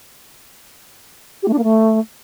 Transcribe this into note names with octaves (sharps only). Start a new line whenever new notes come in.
G4
A3
D4
A#3
A3